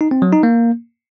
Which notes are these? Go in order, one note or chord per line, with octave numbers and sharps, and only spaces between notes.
D#4
C4
F#3
D#4
A#3